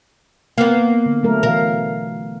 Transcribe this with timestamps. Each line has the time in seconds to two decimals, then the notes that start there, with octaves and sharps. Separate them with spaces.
0.58 A#3 B3 F5
1.06 D3
1.23 F#3 A3 A#4
1.43 B2 E3 A#4 F5